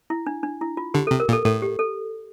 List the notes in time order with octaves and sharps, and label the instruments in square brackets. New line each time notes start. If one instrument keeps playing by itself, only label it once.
[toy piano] E4
D4
D4
E4
F4
[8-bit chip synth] D3 [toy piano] G4
[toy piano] A4
[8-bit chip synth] C3
[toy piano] A#4
[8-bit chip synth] A#2
[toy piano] A4
[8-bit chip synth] A2 [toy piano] A4
[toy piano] G4
A4